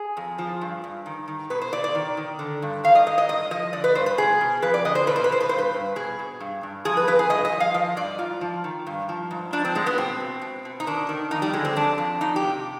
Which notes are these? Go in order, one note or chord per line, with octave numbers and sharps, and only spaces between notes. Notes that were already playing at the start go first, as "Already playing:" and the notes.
Already playing: G#4
F2
F3
G2
G2
D#3
D#3
B2 B4
C5
B2 D5
D5
D#3
D#3
D3
G2
D#3 F5
D#5
G#2 D#5
D#5
G2 D#5
F3 D#5
D3 D5
B4
G2 C5
B4
B2 G#4
B2
F2 B4
D5
D3 D#5
C5
B2 B4
C5
B4
B2 C5
B4
G2 C5
B4
G2
B2 G#4
B2
G2
G2
F2 G#4
B4
F2 B4
G#4
G2 D#5
D#5
F3
F5
F3 D#5
G2 D5
G#2 F4
F3
D#3
G2
F3
G#2
F3 D4
C4
G#2 G#3
B3
B2 C4
B2
B2
B2
D#4
D#3 D4
D#3
F2 D#4
G3
D3 G#3
C4
F2 D4
F2
F2 D#4
G4
C3